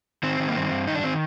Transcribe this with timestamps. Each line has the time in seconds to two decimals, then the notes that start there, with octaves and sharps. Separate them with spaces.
0.23 D#3 C4
0.40 D#3
0.49 A#3
0.56 G2 C4
0.71 G2
0.87 D#3 D#4
0.95 D4
1.03 D#3 C4